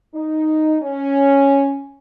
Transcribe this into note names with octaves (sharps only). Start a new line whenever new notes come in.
D#4
C#4